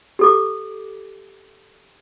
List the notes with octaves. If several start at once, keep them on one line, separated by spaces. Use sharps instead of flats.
G4 A4 D6